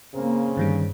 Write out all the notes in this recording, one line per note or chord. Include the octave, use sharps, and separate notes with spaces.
C#3 A#3 C4
G2 D3 D#3 G3